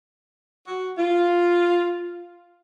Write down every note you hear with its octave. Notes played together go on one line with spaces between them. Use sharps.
F#4
F4